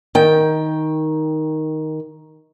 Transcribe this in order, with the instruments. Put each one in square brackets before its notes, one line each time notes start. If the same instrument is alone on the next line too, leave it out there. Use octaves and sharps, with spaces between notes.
[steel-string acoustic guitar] D#3 G5